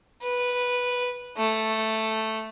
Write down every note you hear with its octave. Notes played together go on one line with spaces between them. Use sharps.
B4
A3